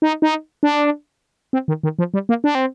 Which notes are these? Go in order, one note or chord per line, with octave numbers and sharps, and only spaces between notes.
D#4
D#4
D4
C4
D#3
D#3
F3
G3
A#3
D4
C4